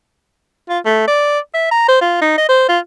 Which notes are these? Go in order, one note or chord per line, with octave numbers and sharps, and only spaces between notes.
F4
A3
D5
E5
A#5
C5
F4
D#4
D#5
C5
F4